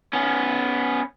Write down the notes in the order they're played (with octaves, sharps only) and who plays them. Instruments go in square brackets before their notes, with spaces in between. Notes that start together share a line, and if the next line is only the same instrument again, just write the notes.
[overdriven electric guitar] B3 C#4